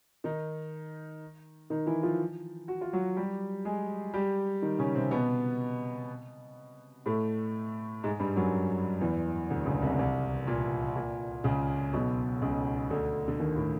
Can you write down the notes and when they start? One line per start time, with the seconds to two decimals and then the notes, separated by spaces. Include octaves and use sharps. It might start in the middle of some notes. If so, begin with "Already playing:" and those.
0.24 D#3 D#4
1.70 D#3 D#4
1.86 E3 E4
2.03 F3 F4
2.68 F#4
2.81 F4
2.93 F#3 F#4
3.16 G3 G4
3.65 G#3 G#4
4.14 G3 G4
4.62 D#3 D#4
4.79 C#3 C#4
4.95 C3 C4
5.11 B2 B3
7.06 A2 A3
8.04 G#2 G#3
8.19 G2 G3
8.36 F#2 F#3
9.01 E2 E3
9.50 D2 D3
9.66 C#2 C#3
9.82 C2 C3
9.99 C2 C3
10.47 A#2
10.96 A#2
11.44 C#2 C#3
11.93 B1 B2
12.42 C#2 C#3
12.90 D2 D3
13.28 D3
13.39 D#2 D#3
13.56 A2